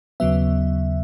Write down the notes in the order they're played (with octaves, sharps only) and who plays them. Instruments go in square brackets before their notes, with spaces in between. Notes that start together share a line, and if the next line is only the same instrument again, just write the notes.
[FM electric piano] D#2 C#3 F#3 B3 E5